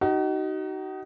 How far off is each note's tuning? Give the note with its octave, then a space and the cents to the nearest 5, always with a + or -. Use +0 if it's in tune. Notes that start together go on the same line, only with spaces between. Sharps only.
D#4 +0 F#4 +40